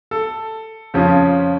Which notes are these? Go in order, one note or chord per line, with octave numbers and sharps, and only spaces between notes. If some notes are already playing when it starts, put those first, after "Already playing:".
A4
F2 C#3 F3 C#4